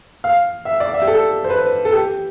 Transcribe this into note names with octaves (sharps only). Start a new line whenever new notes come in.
F5
E5
D5
E5
G4
A4
C5
B4
A4
G4